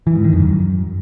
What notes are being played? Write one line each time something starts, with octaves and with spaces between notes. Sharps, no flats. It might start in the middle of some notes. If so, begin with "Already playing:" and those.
E3
G#2
D#3
F2
F#2